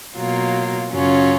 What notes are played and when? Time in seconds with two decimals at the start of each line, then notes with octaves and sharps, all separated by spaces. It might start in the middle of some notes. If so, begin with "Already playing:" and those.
0.17 B2 F#3 A#3 F4
0.91 F#2 C#3 F#3 C#4 F4